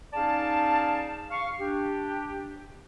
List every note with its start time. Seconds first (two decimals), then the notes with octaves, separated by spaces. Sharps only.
0.14 C#4 D#4 G#4 D5 F5 A5
1.30 F5 C#6
1.59 D4 G4